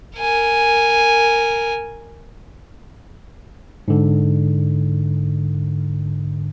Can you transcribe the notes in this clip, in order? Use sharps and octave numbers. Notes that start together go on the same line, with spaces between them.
A#4 G#5
G#2 D3